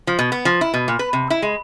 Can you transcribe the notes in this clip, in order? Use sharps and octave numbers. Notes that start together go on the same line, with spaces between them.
F3
B2
B3
F3
E4
B2
A#2
B4
C3
E4
G#3